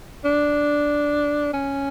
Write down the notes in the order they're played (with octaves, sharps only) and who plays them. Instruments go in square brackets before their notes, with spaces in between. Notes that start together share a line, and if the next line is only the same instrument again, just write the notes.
[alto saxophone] D4
C#4